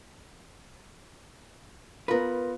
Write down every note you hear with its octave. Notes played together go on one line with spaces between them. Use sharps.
B3 F4 A#4 B4